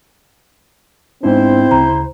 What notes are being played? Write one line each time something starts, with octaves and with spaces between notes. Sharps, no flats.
G#2 B3 C4 D4 E4 C5
D2 C#3 A#5